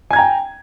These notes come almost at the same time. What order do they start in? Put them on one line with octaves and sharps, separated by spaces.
G#5 G#6 A#5 G5